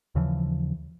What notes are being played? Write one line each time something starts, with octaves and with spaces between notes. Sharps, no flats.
D#2 C#3 E3 F3